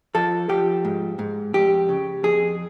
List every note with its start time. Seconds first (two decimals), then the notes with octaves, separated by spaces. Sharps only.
0.15 F3 A4
0.49 F3 G4
0.85 G#2
1.19 G#2
1.54 F2 G4
1.89 C#3
2.23 F2 G#4